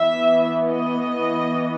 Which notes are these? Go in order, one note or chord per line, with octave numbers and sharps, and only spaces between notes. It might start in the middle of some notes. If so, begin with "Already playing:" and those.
Already playing: E3 B3 E5
D#5